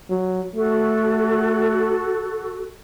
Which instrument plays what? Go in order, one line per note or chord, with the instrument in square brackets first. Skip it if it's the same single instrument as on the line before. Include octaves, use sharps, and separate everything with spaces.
[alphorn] F#3
[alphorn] A3 [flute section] F#4 A4